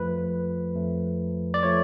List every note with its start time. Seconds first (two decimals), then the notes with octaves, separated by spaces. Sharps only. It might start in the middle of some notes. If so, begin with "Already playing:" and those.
Already playing: F2 F3 A3 B4
0.75 F2 F3 A3
1.54 D5
1.63 F3 A3 C#5